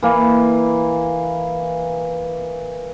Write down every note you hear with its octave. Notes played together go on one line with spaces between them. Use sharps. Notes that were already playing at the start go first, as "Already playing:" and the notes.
E3 A#3